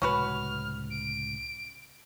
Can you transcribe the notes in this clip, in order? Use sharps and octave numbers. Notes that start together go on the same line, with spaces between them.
C#2 A2 C3 C#4 F#4 B4 F6
D7